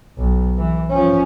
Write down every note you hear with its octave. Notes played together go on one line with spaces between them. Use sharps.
B1
E3
F3 C#4